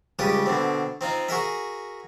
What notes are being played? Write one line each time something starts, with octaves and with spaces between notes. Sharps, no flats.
C#2 C#3 G3 G4 B4 D#6
B2 D3 C4
C4 D#4 F4
F#4 G#4 A#4 E5